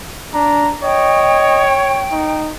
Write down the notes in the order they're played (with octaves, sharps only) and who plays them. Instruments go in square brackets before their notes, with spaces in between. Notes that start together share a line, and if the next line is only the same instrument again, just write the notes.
[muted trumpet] D4 [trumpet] A#5
[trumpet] C#5 [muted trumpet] D#5 [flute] G5
[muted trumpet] D#4